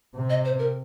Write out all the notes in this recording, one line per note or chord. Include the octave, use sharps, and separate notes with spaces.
C3
D#5
C5
A#4